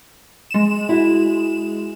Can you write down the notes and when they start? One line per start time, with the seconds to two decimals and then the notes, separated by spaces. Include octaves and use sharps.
0.51 G#3 E7
0.89 E4 F#4